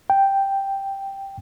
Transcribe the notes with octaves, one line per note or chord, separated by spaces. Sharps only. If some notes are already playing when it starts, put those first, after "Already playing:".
G5